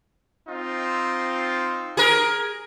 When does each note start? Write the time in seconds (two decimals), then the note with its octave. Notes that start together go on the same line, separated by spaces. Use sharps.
0.47 C4 D#4 F4
1.97 G#4 A#4